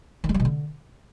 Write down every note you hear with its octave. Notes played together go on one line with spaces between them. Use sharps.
D#3
G#3
G3
B2
D3